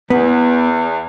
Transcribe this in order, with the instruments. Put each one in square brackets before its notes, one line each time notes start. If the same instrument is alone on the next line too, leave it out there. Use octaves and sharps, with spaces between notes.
[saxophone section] E2 [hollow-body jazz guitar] B3